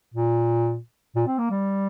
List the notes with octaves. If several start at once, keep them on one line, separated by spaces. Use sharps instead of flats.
A#2
A#2
C4
A#3
G3